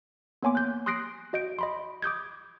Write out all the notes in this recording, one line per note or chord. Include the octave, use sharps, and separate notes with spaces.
A#3 B3 C#5 G#5 C6 D6
F#6 G6
C6 D#6 F#6 A#6 C7 D7
F#4 D#5 G6 D7
D#5 B5 C6
D6 D#6 G6 G#6